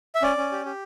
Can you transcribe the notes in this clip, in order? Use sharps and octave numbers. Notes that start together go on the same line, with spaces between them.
E5
C#4 D5
C#4
G4
G4